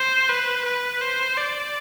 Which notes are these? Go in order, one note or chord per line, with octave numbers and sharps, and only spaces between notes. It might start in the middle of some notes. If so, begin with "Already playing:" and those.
Already playing: C5
B4
B4
C5
D5